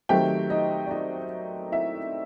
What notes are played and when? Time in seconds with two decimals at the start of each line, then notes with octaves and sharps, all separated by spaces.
0.09 D#3 F#3 A3 C4 G4 G5
0.50 D#4 D#5
0.86 D5
0.91 D#4 D#5
1.72 E4 E5